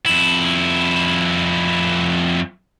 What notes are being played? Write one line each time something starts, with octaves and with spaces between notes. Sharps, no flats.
F2 E4